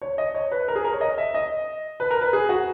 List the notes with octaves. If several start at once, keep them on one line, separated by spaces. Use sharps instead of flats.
C#5
D#5
C#5
B4
A#4
G#4
A#4
C#5
D#5
E5
D#5
B4
A#4
B4
G#4
F#4